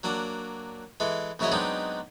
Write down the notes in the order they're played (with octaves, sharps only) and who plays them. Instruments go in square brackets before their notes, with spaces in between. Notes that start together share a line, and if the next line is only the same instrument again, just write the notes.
[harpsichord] F#3 A#3 D4 F#5
E3 G#3 A4
A#1 C#3 F#3 E4 C#5 D#5
F#3 G#3 B3 C4 D4 D#4